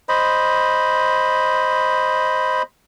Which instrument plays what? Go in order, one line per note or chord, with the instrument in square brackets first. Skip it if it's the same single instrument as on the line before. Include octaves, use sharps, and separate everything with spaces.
[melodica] C5 D#5 B5